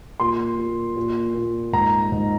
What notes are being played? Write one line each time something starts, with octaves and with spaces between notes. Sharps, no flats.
A#2 C6
A#2
A#2
A#2
G#2 A#5
G#2